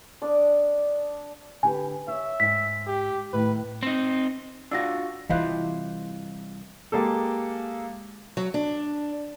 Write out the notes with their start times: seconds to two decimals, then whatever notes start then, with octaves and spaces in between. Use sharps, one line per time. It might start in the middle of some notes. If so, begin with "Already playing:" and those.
0.22 D4 D5 D#6
1.63 D3 G4 B4 G#5
2.08 C#5 E5
2.40 G#2 G#5 B6
2.87 G4
3.33 A2 D#3 B4
3.83 C4 D#4
4.71 D4 F4 F#4 E6 A#6
5.30 C2 E3 E4 F4 C5 D#5 F5 F#6
6.92 G#3 A#3 G4 A4
8.37 F#3
8.54 D4